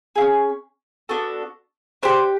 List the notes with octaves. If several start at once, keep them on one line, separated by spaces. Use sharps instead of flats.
C#4 E4 G#4
B3 D4 F#4 A4
D4 G4 C5